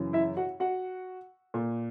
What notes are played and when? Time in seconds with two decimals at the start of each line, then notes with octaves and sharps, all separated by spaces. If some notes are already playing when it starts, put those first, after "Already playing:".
Already playing: F#2 C#3 E3
0.13 E4 E5
0.37 F#4 F#5
0.60 F#4 F#5
1.54 A#2